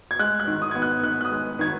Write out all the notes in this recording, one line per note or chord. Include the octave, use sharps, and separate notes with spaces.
G#6
G#3 F#6
F#6
D#3
D#6
B3 G#6
F#6
D#3 F#6
F#6
D#6
G#3
D#3 G#6